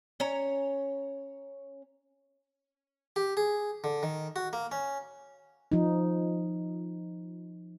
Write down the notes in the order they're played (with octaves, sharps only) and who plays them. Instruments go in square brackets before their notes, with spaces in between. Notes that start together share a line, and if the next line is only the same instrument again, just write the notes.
[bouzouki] C#4 C#5 A#5
[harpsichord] G4
G#4
D3
D#3
F#4
A#3
C#4
[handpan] F3 D#4